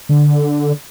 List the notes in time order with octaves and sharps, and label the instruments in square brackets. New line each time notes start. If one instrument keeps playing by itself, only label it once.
[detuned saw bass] D3